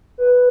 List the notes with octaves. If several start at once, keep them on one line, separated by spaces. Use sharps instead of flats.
B4